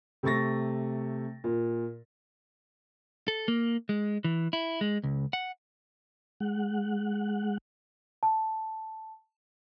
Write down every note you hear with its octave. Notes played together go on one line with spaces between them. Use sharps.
C3 A3 C#6 A6 A#6
A#2
A4
A#3
G#3
E3
E4
G#3
C#2
F#5
G#3 F#5
A5